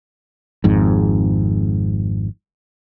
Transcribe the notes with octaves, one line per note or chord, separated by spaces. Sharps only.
G#1 F2 G#2